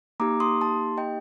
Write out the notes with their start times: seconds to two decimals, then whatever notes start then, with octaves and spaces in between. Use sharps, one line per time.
0.20 A#3 D#4 G4 A#5 D6
0.40 C6 D#6
0.61 A5 C6
0.97 D#5 G5